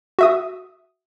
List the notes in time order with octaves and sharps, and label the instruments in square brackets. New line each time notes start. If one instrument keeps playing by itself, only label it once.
[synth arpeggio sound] F#4 E5 D#6